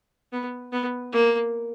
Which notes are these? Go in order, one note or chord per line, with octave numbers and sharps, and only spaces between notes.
B3
B3
A#3